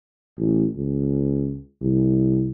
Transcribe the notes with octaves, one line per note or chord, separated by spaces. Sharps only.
A1
C#2
C2